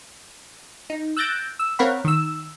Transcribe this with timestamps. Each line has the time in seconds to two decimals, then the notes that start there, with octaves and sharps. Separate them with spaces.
0.90 D#4
1.17 E6 F#6 G6 A6 A#6 D7
1.59 E6
1.79 C4 A#4 C#5 F5 F#5 B5
2.04 D#3 E6